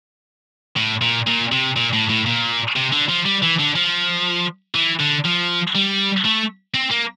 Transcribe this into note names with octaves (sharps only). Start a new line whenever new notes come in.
A2
A#2
A#2
C3
A#2
A2
A2
A#2
C3
D3
F3
G3
E3
D3
F3
E3
D3
F3
G3
A3
C4
A#3